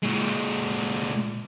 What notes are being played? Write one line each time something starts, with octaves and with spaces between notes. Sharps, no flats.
A#2 G#3